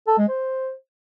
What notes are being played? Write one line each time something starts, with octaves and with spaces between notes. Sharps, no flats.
A4
G#3
C5